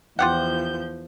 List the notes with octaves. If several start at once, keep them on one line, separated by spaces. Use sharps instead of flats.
E2 F3 F4 G4 F#5 G6